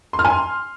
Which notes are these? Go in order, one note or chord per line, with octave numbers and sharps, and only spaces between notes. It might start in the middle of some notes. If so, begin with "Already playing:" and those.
C6
F6
G#5
C6